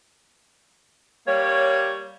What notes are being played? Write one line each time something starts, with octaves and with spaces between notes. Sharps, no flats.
G3 A#3 C#5